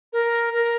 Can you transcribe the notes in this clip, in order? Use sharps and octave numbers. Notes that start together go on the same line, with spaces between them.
A#4
A#4